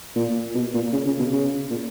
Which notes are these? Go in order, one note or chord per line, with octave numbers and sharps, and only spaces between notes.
A#2
B2
A#2
C#3
C#3
B2
C#3
A#2